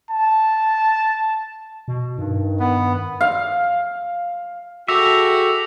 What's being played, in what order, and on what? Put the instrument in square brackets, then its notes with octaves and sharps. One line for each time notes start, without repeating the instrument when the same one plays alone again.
[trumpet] A5
[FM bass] B2
[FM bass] G2 [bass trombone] D#3
[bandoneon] B3
[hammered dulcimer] F5
[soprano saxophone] F#4 [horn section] G#4 A4 G5 [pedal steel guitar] E5 [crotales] D6 A#6 F7